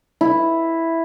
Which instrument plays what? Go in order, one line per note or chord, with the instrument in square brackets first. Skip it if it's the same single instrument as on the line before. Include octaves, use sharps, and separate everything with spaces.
[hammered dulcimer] E4